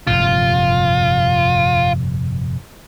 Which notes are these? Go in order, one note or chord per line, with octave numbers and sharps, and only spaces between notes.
F1 G2 A#2 F4